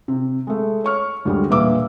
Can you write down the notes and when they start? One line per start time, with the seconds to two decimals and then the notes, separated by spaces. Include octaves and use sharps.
0.08 C3
0.47 G#3 A3
0.84 C#5 C#6 F6
1.25 D2 G3 G#3
1.50 E1 A#2 B4 E5 D6 E6